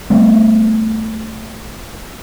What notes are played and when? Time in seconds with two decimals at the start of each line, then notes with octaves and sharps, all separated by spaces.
0.10 G3 A3 B3 C4